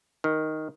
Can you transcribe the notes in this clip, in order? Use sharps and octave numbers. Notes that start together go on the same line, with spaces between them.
D#3